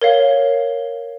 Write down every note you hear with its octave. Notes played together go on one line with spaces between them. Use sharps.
A#4 C#5 F5